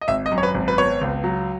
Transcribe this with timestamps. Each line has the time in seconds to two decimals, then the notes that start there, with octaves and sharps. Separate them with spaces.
0.01 D#5
0.08 G#1 E5
0.26 D#5
0.31 F#2
0.38 C#5
0.43 B4
0.54 G#1
0.68 B4
0.78 B3 C#5
1.01 C#2
1.24 F#3